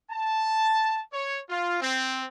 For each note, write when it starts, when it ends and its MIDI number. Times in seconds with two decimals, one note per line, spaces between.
0.10 1.00 81
1.12 1.39 73
1.49 1.78 65
1.80 2.23 60